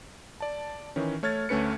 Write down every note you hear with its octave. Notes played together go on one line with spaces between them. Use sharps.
D5 A5
D#3 E3 C#4
A3 C#5 F6 G#6 A6
D2 A3 C#4 B4 C#7